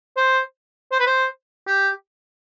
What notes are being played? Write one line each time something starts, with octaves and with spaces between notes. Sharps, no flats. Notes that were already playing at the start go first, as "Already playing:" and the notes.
C5
C5
B4
C5
G4